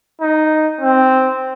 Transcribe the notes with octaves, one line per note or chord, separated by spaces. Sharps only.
D#4
C4